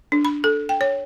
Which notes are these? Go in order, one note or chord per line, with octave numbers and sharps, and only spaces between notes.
D4
B5
A4
G5
C#5